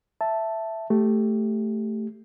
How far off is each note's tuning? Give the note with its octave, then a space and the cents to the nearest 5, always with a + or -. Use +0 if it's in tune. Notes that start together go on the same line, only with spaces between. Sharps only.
E5 +0 A5 +0
A3 +0 G4 +0